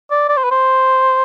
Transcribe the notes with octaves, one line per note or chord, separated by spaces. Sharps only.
D5
D5
C5
B4
C5